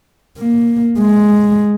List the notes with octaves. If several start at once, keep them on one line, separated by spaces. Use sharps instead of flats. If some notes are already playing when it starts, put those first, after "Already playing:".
A#3
G#3